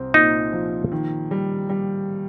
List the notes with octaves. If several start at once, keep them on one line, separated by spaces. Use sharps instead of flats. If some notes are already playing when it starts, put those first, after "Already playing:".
Already playing: C2 C4
A#2 D#4
F3
D#3
G3
G3